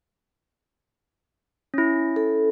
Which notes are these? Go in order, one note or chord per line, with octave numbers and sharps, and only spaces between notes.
C#4 E4
A4